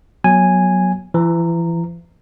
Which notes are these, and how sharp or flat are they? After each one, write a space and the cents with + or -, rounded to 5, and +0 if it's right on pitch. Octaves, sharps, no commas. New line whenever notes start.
F#3 +0 B3 -30 G#5 -5
E3 +35 A#5 -15